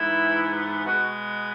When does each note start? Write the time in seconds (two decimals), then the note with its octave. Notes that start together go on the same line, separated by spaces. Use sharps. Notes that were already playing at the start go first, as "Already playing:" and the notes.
Already playing: G#2 E3 B3 E4
0.86 B2 G#3 B3 F#4